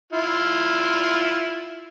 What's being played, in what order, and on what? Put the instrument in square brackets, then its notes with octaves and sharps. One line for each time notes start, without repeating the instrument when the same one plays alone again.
[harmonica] E4 F4